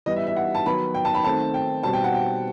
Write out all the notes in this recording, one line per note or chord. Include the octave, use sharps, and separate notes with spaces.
E3 G3 B3 D#5
E5
E5
F#5
A5
D#3 F#3 B3 B5
G5
A5
B5
D#3 A3 C4 A5
G5
B2 G3 C4 A5
G5
F#5
G5